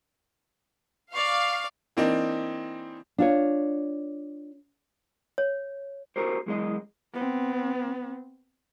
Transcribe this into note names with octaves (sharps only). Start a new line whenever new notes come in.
D5 F5 C#6
E3 A#3 C4 D4 D#4
D4 F4 C#5
C#5
F#4 G4 A#4 C5
F#2 E3 G#3 F#4 D#5
B3 C4